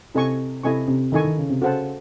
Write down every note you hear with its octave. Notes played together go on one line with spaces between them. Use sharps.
C3 E4 A4 D#5 G#5 C#6
C3 E4 A4 D#5 G#5 C#6
C3
D#3 E4 A4 D#5 G#5 C#6
D#3
C#3
C3
C#3 F#4 A4 C5 F#5 A5